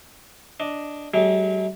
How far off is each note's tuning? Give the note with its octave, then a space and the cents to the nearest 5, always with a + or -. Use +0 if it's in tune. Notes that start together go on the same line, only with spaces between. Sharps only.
D4 +0 D#5 +0
F#3 +45 A3 -45 G#4 -40